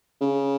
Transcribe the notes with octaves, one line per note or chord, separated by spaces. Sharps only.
C#3